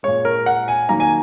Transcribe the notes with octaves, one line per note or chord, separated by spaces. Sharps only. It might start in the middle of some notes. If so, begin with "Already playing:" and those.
A#2 G#3 C#5
A#4
F#5
G#5
D#3 F#3 A#3 A#5
G#5